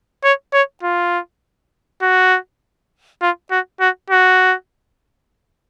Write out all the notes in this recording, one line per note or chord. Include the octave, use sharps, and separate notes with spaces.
C#5
C#5
F4
F#4
F4
F#4
F#4
F#4